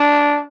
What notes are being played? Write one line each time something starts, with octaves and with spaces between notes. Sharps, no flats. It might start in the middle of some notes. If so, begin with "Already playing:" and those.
Already playing: D4